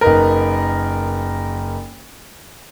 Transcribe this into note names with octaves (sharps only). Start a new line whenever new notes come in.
F#1 D#4 A#4 B4